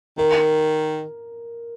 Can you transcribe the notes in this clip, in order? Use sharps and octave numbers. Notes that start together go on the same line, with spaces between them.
D#3 A#4